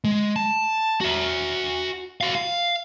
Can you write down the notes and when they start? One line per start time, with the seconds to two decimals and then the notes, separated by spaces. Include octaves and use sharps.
0.04 G#3
0.36 A5
1.01 F#4 E5
2.21 F#4 F5
2.35 F5